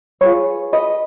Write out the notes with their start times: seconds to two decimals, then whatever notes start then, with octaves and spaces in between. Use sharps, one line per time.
0.21 F4 G#4 B4 C#5
0.73 B4 D#5